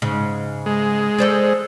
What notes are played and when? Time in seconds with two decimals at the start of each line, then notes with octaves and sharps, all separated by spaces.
0.02 G#2 C#3
0.66 G#3
1.18 A4 C5 D5